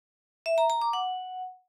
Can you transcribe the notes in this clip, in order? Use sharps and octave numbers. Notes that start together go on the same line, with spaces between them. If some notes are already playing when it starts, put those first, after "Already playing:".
E5
A#5
A#5
D6
F#5